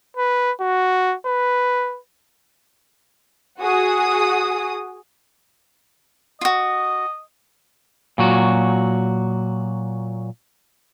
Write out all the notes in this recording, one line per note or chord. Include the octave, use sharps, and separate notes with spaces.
B4
F#4
B4
F#4 G#4 D#6
F4 F#4 D#5
A#2 F#3 F#4